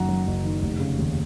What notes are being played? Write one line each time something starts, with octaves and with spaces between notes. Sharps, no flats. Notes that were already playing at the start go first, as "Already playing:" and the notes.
Already playing: F#1 F#2 D#3 F#5 A#5
F#3
F#1
D#3
F1
C#3
D#2